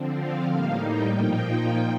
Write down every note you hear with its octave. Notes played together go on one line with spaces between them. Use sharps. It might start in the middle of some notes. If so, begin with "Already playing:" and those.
Already playing: D3 F3 C4
F5
A2 G3 A#3 D#4 F5
G5
A#2 F3 A#3 D#4 G5